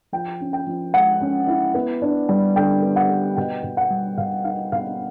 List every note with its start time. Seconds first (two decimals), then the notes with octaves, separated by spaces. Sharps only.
0.12 F3 G5
0.41 C#4
0.53 G5
0.67 F3
0.94 G#3 F#5
1.21 C#4
1.47 E4
1.74 B3
2.02 D4
2.29 G3
2.56 D3 G5
2.82 B3
2.96 F#5
3.10 B3
3.37 B2 G5
3.63 B2
3.77 F#5
3.90 G3
4.18 B2 F5
4.44 D#4 F5
4.72 B2 F5